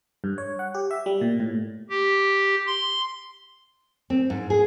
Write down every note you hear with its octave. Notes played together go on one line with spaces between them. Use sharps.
G2
C#5
F#5
G4
E5
G3
A#2
A2
G4
C6
C4
G#2
G#4